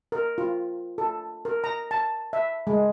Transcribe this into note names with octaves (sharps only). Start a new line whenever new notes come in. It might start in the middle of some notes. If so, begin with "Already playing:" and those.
A#4
F4
A4
A#4
A#5
A5
E5
G#3